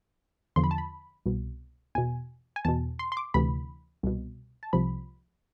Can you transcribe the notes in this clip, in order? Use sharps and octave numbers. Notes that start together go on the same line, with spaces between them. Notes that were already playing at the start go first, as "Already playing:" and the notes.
E2 D3 F3 C6
B5
A5
B5
C2 B2
E2 B2 G#5
G#5
E2 B2 A5
C6
C6
D6
D2 C3 E3 B5
C2 B2
A5
C2 C3 F3 B5